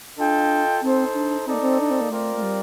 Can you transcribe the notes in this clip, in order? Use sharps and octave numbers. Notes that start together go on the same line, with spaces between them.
D4 F4 A4 D#5 G5
C4 D#4 A4 C5
D4
C4 D#4 A4 D5
A#3
C4
D4
C4
A#3
A3 C4 F4 A#4 D5
A3
G3